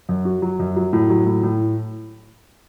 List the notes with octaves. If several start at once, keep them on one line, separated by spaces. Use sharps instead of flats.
F#2
F#4
F#3
F#2
F#3
A2
F#3
A2
A2